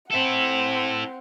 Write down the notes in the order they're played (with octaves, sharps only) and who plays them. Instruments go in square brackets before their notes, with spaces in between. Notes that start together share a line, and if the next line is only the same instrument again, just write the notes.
[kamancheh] C4 F#5 [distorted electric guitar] E4 A4